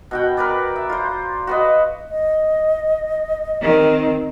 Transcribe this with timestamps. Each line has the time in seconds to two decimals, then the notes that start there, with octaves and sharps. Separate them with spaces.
0.11 B2 F#4 G5
0.37 A#4 B4 D5
0.76 E5
0.89 F4 C5
1.47 F#4 B4 D#5
2.09 D#5
3.62 D#3 C4